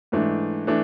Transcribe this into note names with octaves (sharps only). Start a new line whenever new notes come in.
G#2 E3 A3 D4
E3 A3 D4